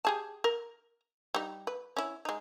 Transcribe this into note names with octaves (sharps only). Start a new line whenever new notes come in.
G4 G#4 A5
A#4
G3 D#4
B4
C#4 E4
G#3 D#4